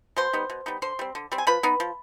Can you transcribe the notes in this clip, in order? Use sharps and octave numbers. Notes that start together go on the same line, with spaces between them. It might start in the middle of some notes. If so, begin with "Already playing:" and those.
B2 C5 C6
G3 B3 D#4
B2
G3 B3 D#4
D3 C5 C6
G3 C4
D3
G3 C4
G#5
F3 B4 B5
B3 D#4
F3